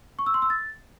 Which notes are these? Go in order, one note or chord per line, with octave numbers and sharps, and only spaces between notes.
C#6
E6
C6
E6
A6